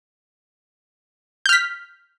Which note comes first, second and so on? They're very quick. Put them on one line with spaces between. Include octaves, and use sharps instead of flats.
G6 F6 B6